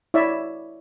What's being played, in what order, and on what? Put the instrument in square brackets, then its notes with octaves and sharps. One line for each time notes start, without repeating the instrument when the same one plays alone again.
[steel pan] E4 C#5 D5 E5